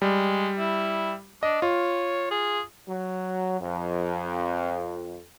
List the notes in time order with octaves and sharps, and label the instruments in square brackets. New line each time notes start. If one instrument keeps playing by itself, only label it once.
[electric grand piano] G3 [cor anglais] G#3
[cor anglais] E4
[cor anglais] D4 [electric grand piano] D#5
[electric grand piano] F4 [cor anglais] C#5
[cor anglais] G#4
[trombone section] F#3
F2